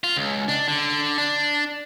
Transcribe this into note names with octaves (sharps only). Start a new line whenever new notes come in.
F4
C#2
D4
D3
D4